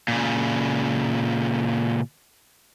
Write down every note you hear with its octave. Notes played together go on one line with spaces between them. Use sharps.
A#2 C#3